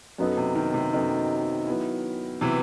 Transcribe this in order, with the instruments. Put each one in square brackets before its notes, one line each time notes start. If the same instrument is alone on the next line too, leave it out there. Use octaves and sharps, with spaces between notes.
[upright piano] F#2 F#3 B3 D#4 A4
[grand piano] C3
D#3
C3
[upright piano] F#2 F#3 B3 D#4 A4 [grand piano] D#3
[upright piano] F#3 B3 E4
[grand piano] C3 E3 [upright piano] F#3 B3 E4